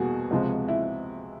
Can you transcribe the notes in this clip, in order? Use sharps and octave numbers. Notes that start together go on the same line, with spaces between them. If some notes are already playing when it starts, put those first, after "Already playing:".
Already playing: E2 B2 G3 A#3 F#4 G#4
C#2 C3 F3 G#3
E4